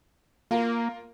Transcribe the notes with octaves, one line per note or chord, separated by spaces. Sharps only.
A#3 F4 A#4